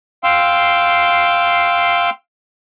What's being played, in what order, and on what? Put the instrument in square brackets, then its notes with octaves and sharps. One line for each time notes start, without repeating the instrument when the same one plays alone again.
[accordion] F5 G5 C6 E6